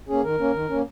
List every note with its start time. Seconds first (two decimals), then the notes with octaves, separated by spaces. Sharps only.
0.08 A#3 C#4 G#4
0.23 D#3 A#4
0.39 A#3 C#4
0.54 D#3
0.69 A#3 C#4